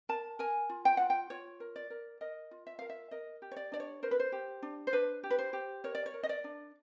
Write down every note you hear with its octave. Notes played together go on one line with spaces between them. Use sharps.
A#4 A5
A#4 G#5
F4
G5
F4 F#5
G5
F4 C#5
A#4
D5
A#4
A#4 D#5
F4
E5
A#4 F5
E5
A#4 D#5
G4
C#5
D5
D4 D5
C#5
A#4 C5
B4
C5
G4
D4
C5
D4 B4
G4
B4
C5
G4
A#4 C#5
D5
C#5
A#4
D#5
D5
D4